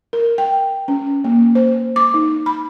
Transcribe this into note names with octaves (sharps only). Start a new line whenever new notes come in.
A#4
G5
C#4
A#3
C5
D6
D#4
B5